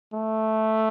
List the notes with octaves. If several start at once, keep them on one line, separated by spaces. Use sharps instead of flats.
A3